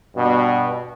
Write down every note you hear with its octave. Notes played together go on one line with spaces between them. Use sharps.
G2 B2